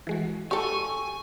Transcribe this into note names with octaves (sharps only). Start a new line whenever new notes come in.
E3 G#3 F#4
G4 A4 G#5 C#6